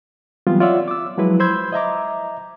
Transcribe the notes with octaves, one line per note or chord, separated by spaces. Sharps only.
E3 F#3 G3 B3 C4 F4
F4 C#5 D5 E5 F#5 E6
D6 E6
F3 F#3 G#3 E4 B4
C5 B5 C6 E6 G6 G#6
D#5 E5 A#5 D6